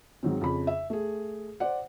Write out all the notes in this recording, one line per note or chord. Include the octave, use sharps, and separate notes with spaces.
G#2 D#3 F#3 C4
F2 C#3 B5
E5
A3 G#4
C5 D5 F#5